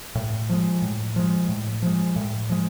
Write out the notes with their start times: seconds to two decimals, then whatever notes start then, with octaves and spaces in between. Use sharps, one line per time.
0.15 A2
0.50 F3 G#3
0.82 A2
1.16 F3 G#3
1.49 A2
1.82 F3 G#3
2.16 A2
2.50 F3 G#3